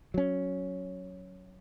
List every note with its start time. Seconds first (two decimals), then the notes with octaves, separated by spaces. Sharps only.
0.14 F#3 C#4